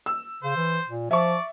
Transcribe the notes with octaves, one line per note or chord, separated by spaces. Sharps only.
E6
C#3 C5
E3
A#2
F3 D5 E5 C#6